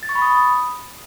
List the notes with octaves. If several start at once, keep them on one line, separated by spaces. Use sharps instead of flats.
A6
C#6
B5
D#6